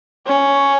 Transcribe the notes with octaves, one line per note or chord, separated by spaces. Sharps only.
C#4